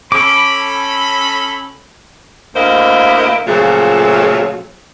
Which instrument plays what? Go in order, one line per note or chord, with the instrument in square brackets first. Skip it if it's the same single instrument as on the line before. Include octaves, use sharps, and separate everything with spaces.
[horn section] C#4 A4 B5 [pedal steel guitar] D6
[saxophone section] D2 A#3 E4 C5 D#5
A#2 C#3 F3 F#3 A3